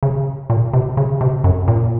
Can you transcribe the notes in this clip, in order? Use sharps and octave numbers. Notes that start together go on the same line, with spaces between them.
C#3
A#2
C3
C#3
C3
F#2
A#2